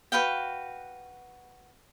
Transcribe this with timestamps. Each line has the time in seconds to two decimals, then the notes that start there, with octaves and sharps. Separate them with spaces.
0.12 F#4 B4 F5 G5